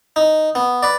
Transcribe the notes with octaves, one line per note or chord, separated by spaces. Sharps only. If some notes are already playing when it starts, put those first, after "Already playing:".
D#4
B3
B4 D5